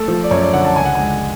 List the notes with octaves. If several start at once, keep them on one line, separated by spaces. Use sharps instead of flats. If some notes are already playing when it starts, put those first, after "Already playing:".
Already playing: A3 A4
F3
D5
F#2 C#5
D5
D3 F#5
A5
C#2 G#5
F#5
G#3 G#5